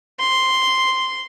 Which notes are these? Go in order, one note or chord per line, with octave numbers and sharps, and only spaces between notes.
C6